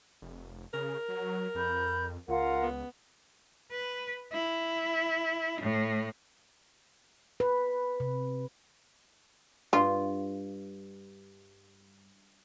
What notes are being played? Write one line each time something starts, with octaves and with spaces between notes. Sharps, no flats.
F1
C#3 A#4
F#3
F2 B5 G6
C#2 F4 A#4 F#5
B3
B4
E4
A2
B4
C3
G2 F4